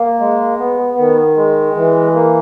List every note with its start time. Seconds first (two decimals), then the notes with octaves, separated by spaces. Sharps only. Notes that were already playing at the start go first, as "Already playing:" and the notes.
Already playing: A#3
0.19 G#3
0.59 B3
0.98 D#3
1.36 G#3
1.76 E3
2.14 A#3